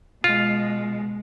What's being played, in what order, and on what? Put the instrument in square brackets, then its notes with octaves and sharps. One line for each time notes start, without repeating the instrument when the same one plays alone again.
[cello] B2 G#3 [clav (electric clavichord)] F4